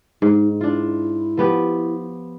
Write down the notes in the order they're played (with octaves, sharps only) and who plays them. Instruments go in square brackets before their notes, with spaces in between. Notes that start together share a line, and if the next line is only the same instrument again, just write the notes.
[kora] G#2 [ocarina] D#4
[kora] D4 F4 [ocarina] E4
[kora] F3 B3 G4